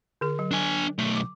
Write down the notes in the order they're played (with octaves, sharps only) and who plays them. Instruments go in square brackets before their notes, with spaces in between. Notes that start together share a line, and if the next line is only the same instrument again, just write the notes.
[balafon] D3 G#4
F#3
[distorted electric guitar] D4 G#5
B1 A3
[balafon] D6